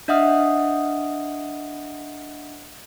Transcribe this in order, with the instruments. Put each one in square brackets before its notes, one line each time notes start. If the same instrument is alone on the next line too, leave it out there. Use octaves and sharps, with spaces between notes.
[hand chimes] D4 D#5 E5 F#5 D#6 F6